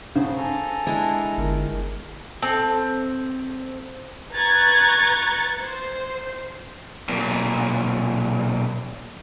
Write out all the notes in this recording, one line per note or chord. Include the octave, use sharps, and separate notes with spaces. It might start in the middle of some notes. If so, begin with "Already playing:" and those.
A2 C#3 F#3 B3 C5
A4 G#5 A#5
G#3 D4 E4
G1 D#3 A#4
C4 A4
B4 A#5 C#6 F#6 G#6 A6
C5
B1 A#2